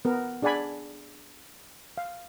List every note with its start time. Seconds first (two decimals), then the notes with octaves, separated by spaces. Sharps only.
0.05 B3 A#4
0.42 D4 G#4 D5 F#5 G#5 B5
1.98 F5